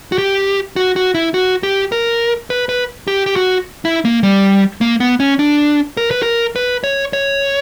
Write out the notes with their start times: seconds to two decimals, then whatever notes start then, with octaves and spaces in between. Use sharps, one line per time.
0.12 F#4
0.18 G4
0.76 F#4
0.96 F#4
1.15 E4
1.34 F#4
1.63 G4
1.92 A#4
2.50 B4
2.69 B4
3.08 G4
3.26 G4
3.36 F#4
3.85 E4
4.05 A#3
4.23 G3
4.81 A#3
5.00 B3
5.20 C#4
5.39 D4
5.97 A#4
6.11 B4
6.23 A#4
6.56 B4
6.84 C#5
7.13 C#5